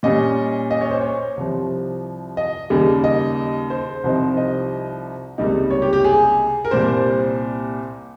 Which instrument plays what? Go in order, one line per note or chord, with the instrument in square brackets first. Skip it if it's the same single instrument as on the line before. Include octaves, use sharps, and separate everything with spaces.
[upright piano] A#2 G3 C#4 D#5
D#5
C#5
C5
C#5
C2 C3 F3
D#5
D#2 C#3 G3 A#3
D#5
C5
C2 C3 F3 C4 D#4
D#5
C#2 C3 G3 A#3 D#4
C#5
G4
G4
G#4
A#4
C2 A#2 G3 C4 C5